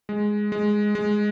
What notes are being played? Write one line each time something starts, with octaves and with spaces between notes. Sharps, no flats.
G#3
G#3
G#3